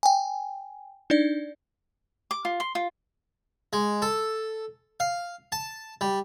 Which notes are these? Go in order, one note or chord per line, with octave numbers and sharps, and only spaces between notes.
G5 G#5
D4 D#4 D5
D6
F4
C6
F4
G#3
A4
F5
A5
G3